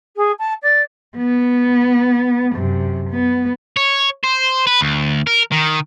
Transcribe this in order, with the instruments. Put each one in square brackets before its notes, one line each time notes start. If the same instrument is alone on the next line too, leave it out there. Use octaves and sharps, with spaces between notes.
[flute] G#4
A5
D5
[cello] B3
F#2 C3
B3
[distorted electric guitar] C#5
C5
B4
D2
A#4
D#3